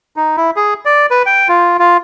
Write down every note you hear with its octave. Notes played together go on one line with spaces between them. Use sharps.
D#4
E4
G#4
D5
B4
G5
F4
F4